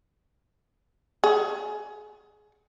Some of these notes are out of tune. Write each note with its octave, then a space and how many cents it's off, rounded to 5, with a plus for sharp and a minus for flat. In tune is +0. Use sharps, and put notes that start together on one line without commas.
G#4 +20